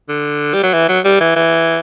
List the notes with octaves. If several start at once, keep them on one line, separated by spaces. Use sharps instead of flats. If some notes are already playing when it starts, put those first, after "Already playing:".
D3
G3
F#3
E3
F#3
G3
E3
E3